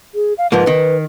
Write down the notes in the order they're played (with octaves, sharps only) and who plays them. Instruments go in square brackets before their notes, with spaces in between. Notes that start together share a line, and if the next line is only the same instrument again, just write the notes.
[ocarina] G#4
F5
[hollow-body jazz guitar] G#2 F3 A#3 [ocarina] B4
[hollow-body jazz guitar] D#3